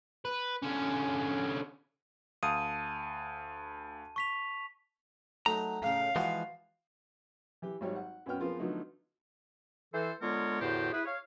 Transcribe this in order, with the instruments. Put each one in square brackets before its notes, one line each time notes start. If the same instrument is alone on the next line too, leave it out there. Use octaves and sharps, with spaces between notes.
[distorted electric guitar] B4
D3 C#4
[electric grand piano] D2 F5 D#6 [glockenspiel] A5 D#7
[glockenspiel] C#6 B6 F7
[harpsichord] F#3 A3 D#4 [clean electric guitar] A#5
[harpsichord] A2 C#3 [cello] F5
[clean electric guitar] E3 F3 G#3 [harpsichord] F#4 C5 G#5
[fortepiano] E3 G4
G#1 F#3 G3 C#5
F#5
F#2 B3 C#4 F#4 G5 F6
F3 B3 C4 F4 G#4 A#4
D3 F3 F#3 A3 B3 D#4
[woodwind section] E3 A4 C5
D3 G#3 B3 F4 A#4 C#5
E2 A2 D3 F#4 G4 C5
E4 G#4 B4
C#5 F5